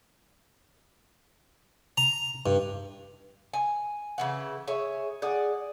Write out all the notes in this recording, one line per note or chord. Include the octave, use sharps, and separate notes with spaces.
A#5
G2
G#5
C#3 E3 F#5
G#4 C#5 E5
G#4 D5 F#5